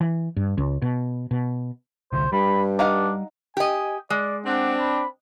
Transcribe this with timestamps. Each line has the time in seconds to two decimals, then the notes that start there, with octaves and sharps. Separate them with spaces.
0.01 E3
0.36 G2
0.58 C#2
0.82 B2
1.31 B2
2.13 C2 D3 C5
2.32 G2 G3 B5
2.79 D4 D#4 F5 F#5
3.57 G4 D#5 G#5
4.10 G#3 D5
4.46 C4 D4 F#5
4.80 B5